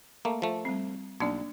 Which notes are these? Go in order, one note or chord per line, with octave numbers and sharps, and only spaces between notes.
A3 A#3
F3 A3
G3 C4
B1 A#3 D4 D5